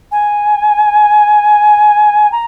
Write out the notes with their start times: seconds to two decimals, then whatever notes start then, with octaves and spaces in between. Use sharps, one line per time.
0.11 G#5
2.32 A#5